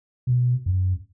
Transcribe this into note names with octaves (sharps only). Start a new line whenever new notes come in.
B2
F#2